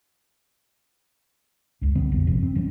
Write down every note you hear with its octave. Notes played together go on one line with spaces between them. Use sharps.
C#2 G2
D3 G3 B3 C4
B1 F2
G#1 F#2 C3 F3
C4
E3 G3 C#4